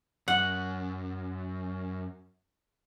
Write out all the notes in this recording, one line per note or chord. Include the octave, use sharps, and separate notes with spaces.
F#2 F#5